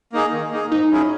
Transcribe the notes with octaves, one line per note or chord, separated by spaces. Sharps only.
A#3 D#4 G#4
D#3
A#3 D#4 G#4
G#2 D#4
F#3 C#4 E4 G#4